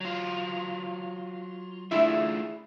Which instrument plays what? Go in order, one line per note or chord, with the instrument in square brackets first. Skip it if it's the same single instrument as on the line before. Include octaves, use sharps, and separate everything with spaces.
[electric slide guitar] F#3 F4
[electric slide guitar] A3 D4 F4 [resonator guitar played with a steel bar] E4 G#4 E5